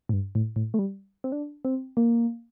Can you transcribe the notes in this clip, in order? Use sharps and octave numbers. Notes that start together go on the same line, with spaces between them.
A2
G2
A2
A2
A3
G3
C4
D4
C4
A#3